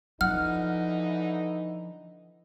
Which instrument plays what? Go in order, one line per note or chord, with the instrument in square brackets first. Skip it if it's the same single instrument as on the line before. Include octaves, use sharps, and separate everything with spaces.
[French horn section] D3 E3 D#4 [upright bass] F3 [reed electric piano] F#5 [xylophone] F6